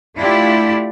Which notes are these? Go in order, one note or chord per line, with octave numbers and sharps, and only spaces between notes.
A3 D4 E4 F4 G4